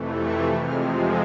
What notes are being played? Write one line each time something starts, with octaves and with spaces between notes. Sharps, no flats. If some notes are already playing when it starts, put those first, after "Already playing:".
Already playing: F2 C3 E3 A3
C#6
F2 C3 F3 G#3 F6